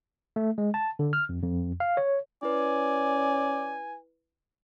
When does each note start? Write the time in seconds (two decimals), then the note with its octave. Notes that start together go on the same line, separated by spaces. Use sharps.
0.36 A3
0.58 G#3
0.74 A5
0.99 D3
1.13 F6
1.29 F2
1.43 F2
1.80 F5
1.97 C#5
2.43 C#4 E4 B4 D5 G#5